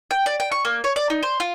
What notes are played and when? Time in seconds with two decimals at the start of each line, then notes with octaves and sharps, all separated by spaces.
0.11 G5
0.26 D5
0.40 G5
0.52 C#6
0.65 A#3
0.84 C#5
0.96 D5
1.10 D#4
1.23 C5
1.40 F4